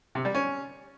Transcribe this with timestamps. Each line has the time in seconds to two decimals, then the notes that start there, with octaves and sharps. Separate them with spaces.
0.15 C3
0.25 G3
0.35 C#4